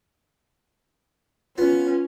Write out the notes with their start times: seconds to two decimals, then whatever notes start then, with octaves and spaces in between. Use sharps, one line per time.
1.58 B3 C#4 F4